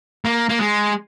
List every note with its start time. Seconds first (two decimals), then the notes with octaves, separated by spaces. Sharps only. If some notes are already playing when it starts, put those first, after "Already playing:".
0.25 A#3
0.49 A#3
0.60 G#3